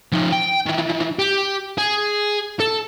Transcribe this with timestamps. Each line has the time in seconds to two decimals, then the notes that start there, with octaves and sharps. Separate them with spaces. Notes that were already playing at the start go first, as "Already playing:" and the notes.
0.12 F3 D#4
0.33 G5
0.66 D#3 E3
1.19 G4
1.78 G#4
2.60 A4